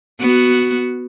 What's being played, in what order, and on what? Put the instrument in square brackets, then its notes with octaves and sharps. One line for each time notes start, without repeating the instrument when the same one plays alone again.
[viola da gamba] B3 F#4